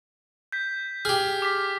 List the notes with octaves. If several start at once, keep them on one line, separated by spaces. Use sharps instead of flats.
G6 B6
G4 G#4 F6
D6 B6